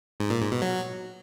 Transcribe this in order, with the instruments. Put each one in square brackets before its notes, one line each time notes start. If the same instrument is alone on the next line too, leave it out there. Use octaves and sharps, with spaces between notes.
[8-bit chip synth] G#2
A#2
G#2
B2
F#3